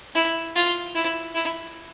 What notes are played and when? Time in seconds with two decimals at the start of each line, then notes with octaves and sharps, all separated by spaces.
0.15 E4
0.56 F4
0.95 E4
1.35 E4